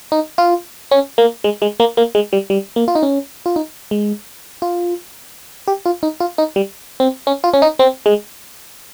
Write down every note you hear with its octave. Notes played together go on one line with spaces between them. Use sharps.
D#4
F4
C#4
A#3
G#3
G#3
A#3
A#3
G#3
G3
G3
A#3
F4
D#4
C#4
F4
D#4
G#3
F4
G4
F4
D#4
F4
D#4
G3
C4
C#4
F4
C#4
D#4
C4
G#3